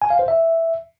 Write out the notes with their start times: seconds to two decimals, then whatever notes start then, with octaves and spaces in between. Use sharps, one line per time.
0.02 G#5
0.10 F5
0.19 C5
0.28 E5